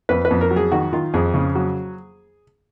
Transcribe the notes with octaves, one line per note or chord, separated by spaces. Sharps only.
F2 B4
B4
F2
A#4
F#3
G#4
D#3 F#4
D#3 F4
F2 G#4
C#3
F#3